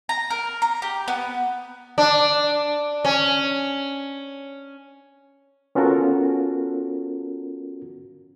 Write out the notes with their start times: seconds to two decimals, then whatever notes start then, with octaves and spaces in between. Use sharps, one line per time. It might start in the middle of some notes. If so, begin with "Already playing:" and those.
0.09 A#5
0.30 A#4
0.62 A#5
0.82 G4
1.08 B3
1.98 D4
3.05 C#4
5.75 B3 C#4 F4 F#4 A4 A#4